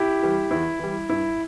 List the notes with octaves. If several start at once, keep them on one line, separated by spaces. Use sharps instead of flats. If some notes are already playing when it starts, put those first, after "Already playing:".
Already playing: E4 G4
E3 G3
E2 E4
E3 G3
G2 E4